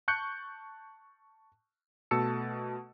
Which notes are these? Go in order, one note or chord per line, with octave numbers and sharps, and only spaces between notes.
A5 C#6 F#6 G6 C#7
B2 A3 A5 E6 A6 C#7